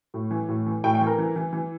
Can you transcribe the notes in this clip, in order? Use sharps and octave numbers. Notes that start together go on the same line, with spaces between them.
A2
E3
A2
E3
A2 G5
G5
E3
A#4
E3
E3
E3